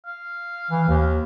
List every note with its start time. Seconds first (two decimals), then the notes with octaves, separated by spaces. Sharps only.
0.07 F5
0.71 E3
0.88 D#2